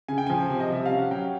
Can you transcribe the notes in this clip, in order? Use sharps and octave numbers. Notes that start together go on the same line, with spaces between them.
C#3 G#5
G5
F3 G#5
C3
D#5
G3 E5
F5
C#4
F#5
F#3 G5